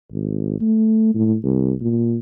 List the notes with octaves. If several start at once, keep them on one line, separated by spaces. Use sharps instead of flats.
G#1
A3
A2
C2
A#2